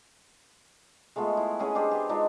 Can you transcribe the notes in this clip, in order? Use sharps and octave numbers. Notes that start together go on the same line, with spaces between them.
G#3 A3 B3 F4
E4
C#4 G#4 D#5 F#5
D4 G4 G#4 C5
G4 B4
G#3 D4 D#4 F4